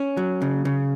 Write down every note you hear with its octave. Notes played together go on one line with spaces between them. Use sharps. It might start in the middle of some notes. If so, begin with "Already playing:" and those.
Already playing: C#4
F#3
C#3
C#3